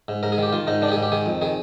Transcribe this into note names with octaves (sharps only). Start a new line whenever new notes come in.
G#2
G#2 A#4
G#4
D#3 G4
D#3 F4
G#2 D#4
D#3 D4
G4
G#2 G#4
G4
D#3 G#4
F2
D#3 G#4